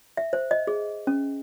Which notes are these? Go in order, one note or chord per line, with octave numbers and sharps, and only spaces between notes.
E5
C5
D#5
G#4
C#4